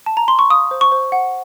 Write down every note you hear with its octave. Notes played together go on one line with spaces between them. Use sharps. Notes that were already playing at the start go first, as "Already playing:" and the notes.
A5
A#5
C6
C#6
F5 D#6
C5
C#6
C5
F#5